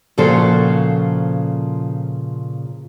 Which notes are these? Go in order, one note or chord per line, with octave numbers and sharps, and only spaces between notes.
A#2 C#3 F3 F#4 A4 C5